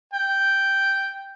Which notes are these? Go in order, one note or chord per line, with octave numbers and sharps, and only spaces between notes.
G5